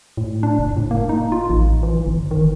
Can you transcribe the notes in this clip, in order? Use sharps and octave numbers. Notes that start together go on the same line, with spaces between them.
A2
D4
F#1
A2
A#3
D#4
F4
A1
E3
G1
D#3